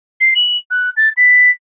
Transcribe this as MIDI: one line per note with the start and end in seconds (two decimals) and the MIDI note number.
0.20 0.32 96
0.35 0.57 102
0.71 0.90 90
0.97 1.09 93
1.17 1.51 95